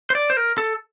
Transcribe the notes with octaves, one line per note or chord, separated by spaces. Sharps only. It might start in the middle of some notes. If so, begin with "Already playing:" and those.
C5
D5
C5
A#4
A4